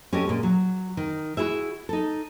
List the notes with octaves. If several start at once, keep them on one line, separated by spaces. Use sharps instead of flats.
C#4 F#4 G4 A4 D#5
A#2 G#3
F#3
D#3
E4 F#4 G#4 E5
D#4 A4